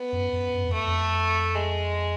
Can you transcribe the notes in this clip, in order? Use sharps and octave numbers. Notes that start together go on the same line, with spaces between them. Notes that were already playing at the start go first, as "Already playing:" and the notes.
Already playing: B3
F#2
F#2
F#2
F2
A3
F2
G#3